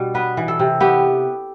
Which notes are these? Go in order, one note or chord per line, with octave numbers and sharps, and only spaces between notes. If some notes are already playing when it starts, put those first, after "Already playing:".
Already playing: B2 G3 D4
B3 B4
E3
A4
C3
B3 G4